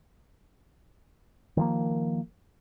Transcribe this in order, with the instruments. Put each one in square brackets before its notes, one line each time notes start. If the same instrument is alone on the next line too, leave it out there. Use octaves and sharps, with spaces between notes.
[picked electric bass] D#3 F3 A#3